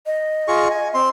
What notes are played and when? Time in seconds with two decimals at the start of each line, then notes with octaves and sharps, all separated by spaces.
0.06 D#5
0.48 F4 G#4 C#6
0.71 G#5
0.94 C4 C6